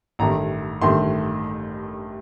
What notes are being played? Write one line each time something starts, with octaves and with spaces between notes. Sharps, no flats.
A1 G2 D#3 A3 A#5
A1 G2 D#3 A3 C6